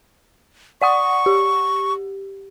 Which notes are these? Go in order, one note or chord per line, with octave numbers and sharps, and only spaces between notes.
D5 F#5 C#6 D#6
G4